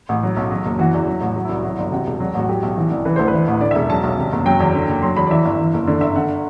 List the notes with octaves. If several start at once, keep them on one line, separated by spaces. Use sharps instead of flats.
A1
F#3
B1
F#3
F#1
E3 F#4
E2
F#3
A1
F#3 F#4
E4
C2
F#3 E4
G1
C3 F#4
E1
F#3
A1 F#4
F#3 G4
B1
E3
C2
E3 B4
D2 C5
B4
E3
A1
D3 D5
E5
E1
F#3 A5
B1
C3
F#1
F#3 G5
E2
D3
F#1
F#3 C6
E2 B5
D5
E3 E5
G1
E3
F#1
D3 D5
G1 E5
D3 F#5